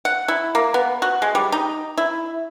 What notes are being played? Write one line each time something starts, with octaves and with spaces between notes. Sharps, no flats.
F#5
E4
A#3
B3
F#4
G#3
G3
D#4
E4